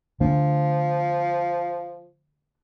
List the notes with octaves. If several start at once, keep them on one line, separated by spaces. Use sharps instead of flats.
D3 F3 A3 D4